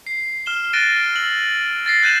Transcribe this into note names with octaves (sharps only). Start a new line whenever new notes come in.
C7
F6 E7 G7
F#6 A6 A#6 D7 D#7 G7
E6 F#7
A6 A#6 C7
F#6 G6 D#7 E7 F#7